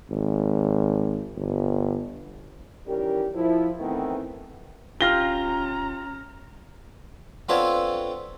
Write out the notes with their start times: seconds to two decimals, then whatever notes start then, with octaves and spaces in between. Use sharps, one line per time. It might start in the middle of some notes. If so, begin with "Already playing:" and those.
0.10 G#1
1.37 G1
2.86 D#3 E3 G3 C#4 G4 A#4
3.35 F3 E4
3.80 D#3 E3 A3 B3 C4 E4
5.01 D1 C#4 F4 G4 A#5 F6 A#6 G7
7.49 B3 C4 D4 F4 A4 C#5